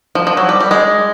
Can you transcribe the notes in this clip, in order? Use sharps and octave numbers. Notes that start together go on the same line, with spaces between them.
F3
F3
F#3
G3
G3
G#3